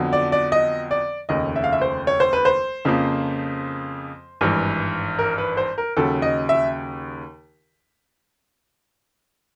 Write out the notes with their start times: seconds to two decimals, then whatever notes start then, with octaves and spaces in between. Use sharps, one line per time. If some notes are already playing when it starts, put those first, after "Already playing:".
Already playing: F2 D3 F#3 B3
0.13 D5
0.32 D5
0.52 D#5
0.91 D5
1.29 F1 D#2 C#3 D#5
1.56 E5
1.64 F5
1.73 E5
1.82 C5
2.07 C#5
2.20 C5
2.33 B4
2.45 C5
2.85 F2 C#3 F3 A#3
4.41 G#1 G2 E3
5.19 A#4
5.38 B4
5.57 C5
5.78 A#4
5.97 D#2 C#3 F#3 A4
6.22 D#5
6.49 E5